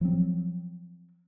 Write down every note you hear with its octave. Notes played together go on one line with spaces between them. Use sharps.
F3 F#3 C4